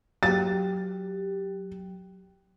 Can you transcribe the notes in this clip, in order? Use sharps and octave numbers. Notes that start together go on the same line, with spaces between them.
F#3 G4 A6